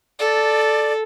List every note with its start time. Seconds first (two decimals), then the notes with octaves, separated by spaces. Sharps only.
0.19 A4 D5